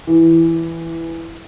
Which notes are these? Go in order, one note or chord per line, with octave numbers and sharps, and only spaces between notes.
E3